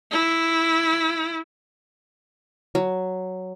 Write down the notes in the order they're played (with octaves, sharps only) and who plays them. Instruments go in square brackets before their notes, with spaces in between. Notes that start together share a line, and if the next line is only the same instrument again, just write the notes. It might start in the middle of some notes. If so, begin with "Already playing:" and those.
[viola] E4
[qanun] F#3